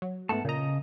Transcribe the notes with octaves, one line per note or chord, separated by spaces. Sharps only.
F#3
G#2 A3 B3 F#5 A5
A#2 C#3 D#5 A#5